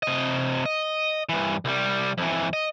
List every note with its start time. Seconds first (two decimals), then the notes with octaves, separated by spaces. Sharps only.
0.03 C3 D#5
0.66 D#5
1.29 G2 E3
1.65 C2 G3
2.18 F2 E3
2.53 D#5